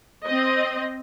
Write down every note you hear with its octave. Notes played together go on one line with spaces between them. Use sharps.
C4 D#5